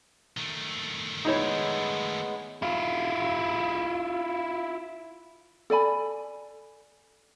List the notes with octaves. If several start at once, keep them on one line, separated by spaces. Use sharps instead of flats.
D#3 A3
G#3 B3 D#4 E4 C#5
E4 F4
A4 D5 G#5 B5